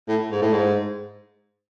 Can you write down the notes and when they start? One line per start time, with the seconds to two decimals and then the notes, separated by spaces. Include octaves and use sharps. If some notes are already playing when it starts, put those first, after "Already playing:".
0.08 A2
0.31 G#2
0.42 A2
0.53 G#2